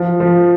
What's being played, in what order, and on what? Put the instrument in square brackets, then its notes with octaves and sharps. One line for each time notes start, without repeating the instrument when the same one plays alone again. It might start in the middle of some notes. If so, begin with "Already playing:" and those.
Already playing: [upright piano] F3
F3